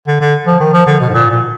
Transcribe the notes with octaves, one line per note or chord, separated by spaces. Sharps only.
D3
D3
F3
D#3
F3
D3
B2
G#2
A#2
A#2